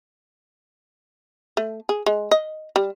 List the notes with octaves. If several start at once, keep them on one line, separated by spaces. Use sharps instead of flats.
A3
G#4
G#3
D#5
G3